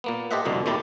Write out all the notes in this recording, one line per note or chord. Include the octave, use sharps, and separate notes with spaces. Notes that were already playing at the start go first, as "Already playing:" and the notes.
A#2 A#3 B3
G4 A4 C5 D#5 E5 F#5
C2 F2 B2 D3
D#2 A#2 D#3 E4 G4 A5